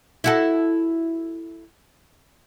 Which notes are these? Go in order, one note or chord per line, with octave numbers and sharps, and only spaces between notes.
E4 F#4 A4